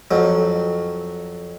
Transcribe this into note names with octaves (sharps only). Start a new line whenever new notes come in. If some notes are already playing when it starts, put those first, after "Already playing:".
F2 F#3